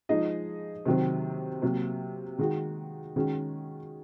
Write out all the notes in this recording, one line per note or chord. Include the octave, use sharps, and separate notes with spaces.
F3 G#3 D#4 G#4 D#5
C3 D#3 F#3 C4
C3 F#3 A#3
D#3 G#3 D#4 F#4
D#3 G#3 C#4 F#4